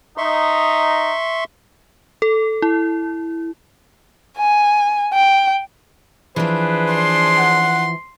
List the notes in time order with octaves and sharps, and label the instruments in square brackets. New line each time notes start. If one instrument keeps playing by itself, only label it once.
[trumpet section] D#4 [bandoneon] E5 C6 C#6
[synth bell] A4
E4
[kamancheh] G#5
G5
[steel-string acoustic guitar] E3 F3 [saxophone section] D4 G#4 C5 [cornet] B4
[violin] C6
[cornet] F#5